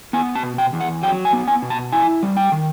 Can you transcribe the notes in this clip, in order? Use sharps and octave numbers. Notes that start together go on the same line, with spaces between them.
B3 G#5
A5
B2
G5
E2
F#5
F#3 G5
G#5
B3
G#5
B2
A5
E4 G#5
G3
G5
D#3